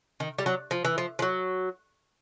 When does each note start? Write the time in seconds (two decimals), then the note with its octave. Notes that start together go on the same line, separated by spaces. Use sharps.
0.20 D#3
0.39 G3
0.46 F#3
0.71 F3
0.85 E3
0.98 F3
1.19 F3
1.22 F#3